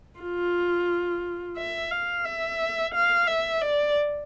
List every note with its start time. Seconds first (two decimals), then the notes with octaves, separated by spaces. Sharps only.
0.20 F4
1.57 E5
1.91 F5
2.25 E5
2.94 F5
3.28 E5
3.62 D5